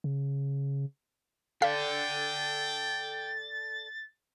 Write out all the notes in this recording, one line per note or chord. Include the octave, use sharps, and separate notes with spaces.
C#3
A4 D5 F5 G5 A6 B6